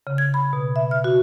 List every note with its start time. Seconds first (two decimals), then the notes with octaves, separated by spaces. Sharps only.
0.07 C#3
0.18 G#6
0.34 B5
0.53 B2
0.76 E5
0.91 F6
1.04 F#4